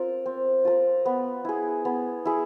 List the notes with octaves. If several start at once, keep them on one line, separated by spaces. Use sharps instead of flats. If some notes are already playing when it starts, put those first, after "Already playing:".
Already playing: C4 F4 A#4
C4
F4 A#4
B3
E4 G#4
B3
E4 G#4